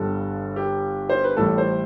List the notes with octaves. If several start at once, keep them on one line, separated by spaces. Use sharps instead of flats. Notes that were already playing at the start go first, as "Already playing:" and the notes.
Already playing: G1 G2 D3 G3 A4
G4
C5
B4
A1 A2 G3 A4
C5